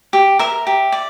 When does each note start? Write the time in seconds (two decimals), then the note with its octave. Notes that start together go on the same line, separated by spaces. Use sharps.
0.13 G4
0.39 A#4 E5
0.67 G4
0.92 D5